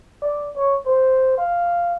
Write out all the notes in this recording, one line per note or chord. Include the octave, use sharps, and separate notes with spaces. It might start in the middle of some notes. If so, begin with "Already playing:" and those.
D5
C#5
C5
F5